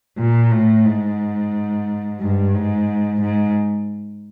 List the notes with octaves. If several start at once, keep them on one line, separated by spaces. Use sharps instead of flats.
A#2
A2
G#2
G2
G#2
G#2